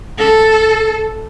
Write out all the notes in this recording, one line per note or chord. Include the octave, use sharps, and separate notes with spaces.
A4